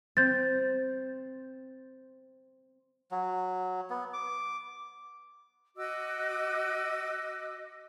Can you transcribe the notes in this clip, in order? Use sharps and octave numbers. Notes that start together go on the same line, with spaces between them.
C4 G6 A6
F#3
B3
D6
F#4 D#5 D6 E6